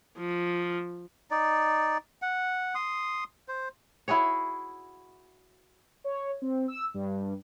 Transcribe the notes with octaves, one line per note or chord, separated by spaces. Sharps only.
F3
D#4 D5
F#5
C6 D#6
C5
E4 F#4 G#4 C#5
C#5
C4
E6
G2